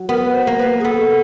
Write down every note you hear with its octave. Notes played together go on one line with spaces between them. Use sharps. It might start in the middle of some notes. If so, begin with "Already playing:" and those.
Already playing: F#3
B3 A#4
B4
C5
A#3
B4
G#4
B3 A4